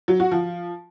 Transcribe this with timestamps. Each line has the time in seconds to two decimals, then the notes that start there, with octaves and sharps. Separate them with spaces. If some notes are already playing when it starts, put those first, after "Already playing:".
0.08 F#3
0.20 F#4
0.31 F3